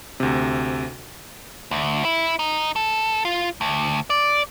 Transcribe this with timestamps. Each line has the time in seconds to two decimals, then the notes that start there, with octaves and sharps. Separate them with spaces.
0.20 D2 C3
1.71 D2
2.05 E4
2.39 D#4
2.76 A4
3.25 F4
3.61 D2
4.10 D5